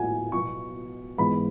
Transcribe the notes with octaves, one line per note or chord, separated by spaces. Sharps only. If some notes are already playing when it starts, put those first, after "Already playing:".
Already playing: A2 F#3 B3 F#5 G#5
B2 F#3 B3 C#6
G#2 E3 G#3 B3 B5